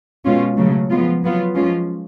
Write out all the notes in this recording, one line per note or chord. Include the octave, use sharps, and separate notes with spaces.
B2 G#3 C#4 F4
C#3 F#3 A3
F3 G#3 B3 F4
F#3 B3 F4
F3 G#3 C#4 F4